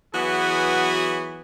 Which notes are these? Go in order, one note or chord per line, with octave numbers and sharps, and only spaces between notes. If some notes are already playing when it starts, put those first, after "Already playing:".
E3 F#3 B3 F#4 G#4